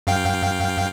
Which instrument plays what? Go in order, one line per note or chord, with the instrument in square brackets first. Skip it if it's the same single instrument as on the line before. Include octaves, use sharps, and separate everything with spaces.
[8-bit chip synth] F#2 F5 G5